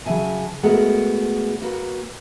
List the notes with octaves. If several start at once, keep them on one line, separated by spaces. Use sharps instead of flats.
C#3 F#3 G#3 E5 G#5 A5
G#3 A3 B3 F#4 A#4 F#5
A#3 F#4 B4